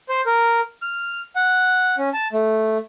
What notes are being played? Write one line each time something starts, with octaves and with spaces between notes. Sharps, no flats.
C5
A#4
F6
F#5
C#4
A5
A3